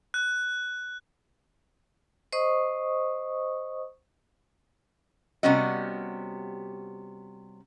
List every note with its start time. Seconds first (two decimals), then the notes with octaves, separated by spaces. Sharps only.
0.14 F#6
2.32 C5 D#5 C#6 D#6
5.43 C3 G3 B3 C#4 F#4 D#5